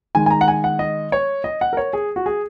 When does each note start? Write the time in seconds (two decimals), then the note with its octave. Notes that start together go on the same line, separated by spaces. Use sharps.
0.15 D#3 G#3 G#5
0.26 G#5
0.30 A#5
0.41 F#5
0.48 G#5
0.64 F#5
0.79 D#5
1.12 C#5
1.44 D#5
1.61 F#5
1.73 A#4
1.77 C#5
1.93 G#4
2.16 F#4
2.26 G#4